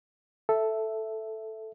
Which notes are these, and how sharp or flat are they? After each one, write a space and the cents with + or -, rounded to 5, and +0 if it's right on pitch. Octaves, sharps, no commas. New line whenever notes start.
A4 +0 E5 +0